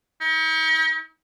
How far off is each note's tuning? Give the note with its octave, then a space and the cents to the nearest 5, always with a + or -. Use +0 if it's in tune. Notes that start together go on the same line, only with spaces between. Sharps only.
D#4 +45